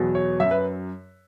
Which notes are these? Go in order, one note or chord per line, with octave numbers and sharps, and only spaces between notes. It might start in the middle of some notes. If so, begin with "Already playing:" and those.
Already playing: E2 B2 F#3
C#5
F#2 F#3 E5
B4